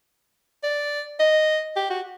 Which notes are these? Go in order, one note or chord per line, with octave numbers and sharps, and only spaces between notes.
D5
D#5
G4
F#4